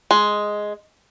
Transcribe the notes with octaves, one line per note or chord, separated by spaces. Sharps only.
G#3